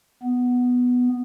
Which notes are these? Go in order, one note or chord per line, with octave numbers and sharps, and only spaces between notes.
B3